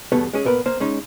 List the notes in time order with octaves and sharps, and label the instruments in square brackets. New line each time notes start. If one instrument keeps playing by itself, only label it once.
[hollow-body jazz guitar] E2 G2 B2 A3 B3
G#3 C#4 G#4
A#2 B3 A#4 B4
A#3 C5 F5
G#3 C#4 D#4